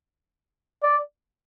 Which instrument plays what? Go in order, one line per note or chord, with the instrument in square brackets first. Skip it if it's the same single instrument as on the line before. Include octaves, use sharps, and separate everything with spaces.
[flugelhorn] D5